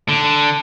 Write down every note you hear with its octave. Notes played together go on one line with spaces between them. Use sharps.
D3